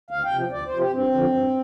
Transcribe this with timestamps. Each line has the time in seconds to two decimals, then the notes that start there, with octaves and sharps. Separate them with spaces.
0.11 D2 F5
0.24 G5
0.31 C3 F3
0.52 D2 D5
0.66 C5
0.73 C3 F3
0.79 G4
0.93 G2 C4
1.14 D3 F3
1.34 G2